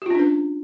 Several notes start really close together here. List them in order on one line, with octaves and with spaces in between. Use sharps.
G4 F4 C#4 D4 B4